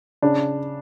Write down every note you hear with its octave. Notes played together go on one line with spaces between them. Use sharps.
C#3 D4